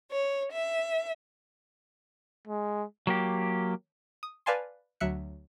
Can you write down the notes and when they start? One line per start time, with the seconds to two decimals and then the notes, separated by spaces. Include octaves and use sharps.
0.11 C#5
0.50 E5
2.48 G#3
3.07 F#3 A#3 G4
4.23 D#6
4.46 B4 D5 F5 G#5 A5 C6
5.00 D2 F#3 E5 F#6 C#7